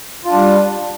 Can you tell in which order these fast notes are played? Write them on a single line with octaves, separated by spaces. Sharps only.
F4 D4 G3